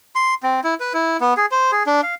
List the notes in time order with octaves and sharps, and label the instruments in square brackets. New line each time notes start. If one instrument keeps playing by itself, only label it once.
[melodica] C6
C4
E4
B4
E4
B3
G#4
C5
G#4
D4
F5